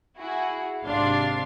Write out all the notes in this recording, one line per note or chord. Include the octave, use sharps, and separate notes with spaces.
E4 F#4 G#4
G#1 C3 D4 F5 C6